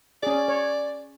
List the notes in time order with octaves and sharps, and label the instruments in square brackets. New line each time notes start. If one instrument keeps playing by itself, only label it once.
[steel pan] C#4 G#4 [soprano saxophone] D5
[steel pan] C#5